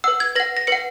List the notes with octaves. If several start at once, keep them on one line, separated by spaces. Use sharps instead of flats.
B4 F#5 E6
G#6
B4 F#5 A#6
A#6
B4 F#5 C#7